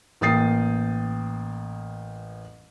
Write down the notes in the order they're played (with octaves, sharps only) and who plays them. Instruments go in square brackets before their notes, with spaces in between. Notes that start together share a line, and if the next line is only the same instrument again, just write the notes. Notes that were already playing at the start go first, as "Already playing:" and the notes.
[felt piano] A1 A#3 G5 D#6 A6 C7